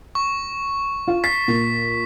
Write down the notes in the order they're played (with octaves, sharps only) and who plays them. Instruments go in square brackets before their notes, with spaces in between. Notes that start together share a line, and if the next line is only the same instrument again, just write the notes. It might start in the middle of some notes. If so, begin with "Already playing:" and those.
[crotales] C#6
[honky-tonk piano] F4
[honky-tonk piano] A6 C7 [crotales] B6
[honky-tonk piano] A#2